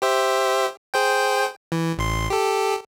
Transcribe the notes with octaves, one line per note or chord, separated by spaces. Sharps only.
G4 C5 E5
G#4 C5 G5
E3
A1 C6
G4 A4